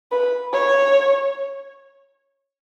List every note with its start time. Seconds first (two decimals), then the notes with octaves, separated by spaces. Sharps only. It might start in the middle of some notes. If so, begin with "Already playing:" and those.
0.11 B4
0.53 C#5